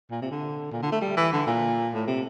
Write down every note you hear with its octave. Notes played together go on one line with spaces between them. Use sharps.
A#2
C3
D3
A#2
D3
A3
G3
E3
D3
A#2
A2
C3